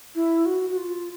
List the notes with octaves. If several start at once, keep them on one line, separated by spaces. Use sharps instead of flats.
E4
F#4
F#4
F4